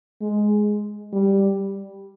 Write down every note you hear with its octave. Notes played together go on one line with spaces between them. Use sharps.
G#3
G3